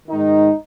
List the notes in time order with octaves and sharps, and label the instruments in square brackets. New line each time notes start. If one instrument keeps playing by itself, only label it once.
[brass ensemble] G#2 D#3 D#4